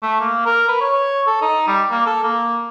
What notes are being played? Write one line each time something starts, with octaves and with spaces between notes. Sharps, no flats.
A3
A#3
A#4
B4
C#5
A4
D#4
G3
A#3
A4
A#3